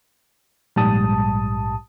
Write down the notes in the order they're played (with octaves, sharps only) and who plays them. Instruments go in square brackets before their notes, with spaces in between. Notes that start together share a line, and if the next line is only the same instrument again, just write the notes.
[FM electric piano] A#1 G#2 G3 A5 D#6